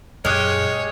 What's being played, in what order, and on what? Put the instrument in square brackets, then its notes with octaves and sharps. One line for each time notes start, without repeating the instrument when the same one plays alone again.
[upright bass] F#2 A#2 [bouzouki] G#3 G4 [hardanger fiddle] C#5 [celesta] F6 F#6 G#6